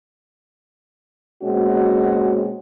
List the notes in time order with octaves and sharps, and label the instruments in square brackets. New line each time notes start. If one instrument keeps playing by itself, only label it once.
[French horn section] B2 G#3 A#3 C4 C#4 F#4